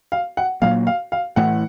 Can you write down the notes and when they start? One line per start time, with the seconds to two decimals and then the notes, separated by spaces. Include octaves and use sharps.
0.12 F5
0.37 F#5
0.62 A#2 F#3 A#3 F5
0.87 F5
1.12 F5
1.36 A2 E3 A3 F#5